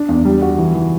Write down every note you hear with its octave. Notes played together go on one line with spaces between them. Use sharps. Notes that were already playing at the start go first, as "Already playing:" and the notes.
Already playing: D4
E2
G3
F#4
E3
E3